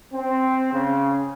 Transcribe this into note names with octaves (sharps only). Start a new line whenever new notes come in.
C4
C#3